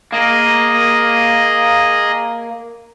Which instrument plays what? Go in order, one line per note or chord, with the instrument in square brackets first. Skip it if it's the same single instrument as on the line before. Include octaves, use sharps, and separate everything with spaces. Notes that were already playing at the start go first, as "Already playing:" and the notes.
[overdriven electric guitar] A#3 [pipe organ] G#4 D#5